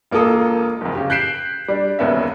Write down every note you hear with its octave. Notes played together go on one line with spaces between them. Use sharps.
E1 A#3 F4 A4 D#6
F#1 F2
C#3 G4
F#6 G6 B6 C7 D7 E7
G3 D4
E1 D#2 B3 C#4 E5